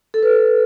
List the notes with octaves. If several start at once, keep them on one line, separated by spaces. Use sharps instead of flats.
A4
B4